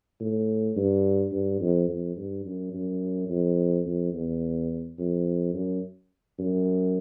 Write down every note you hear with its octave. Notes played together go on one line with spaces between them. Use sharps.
A2
G2
G2
F2
F2
G2
F#2
F#2
F2
F2
E2
F2
F#2
F#2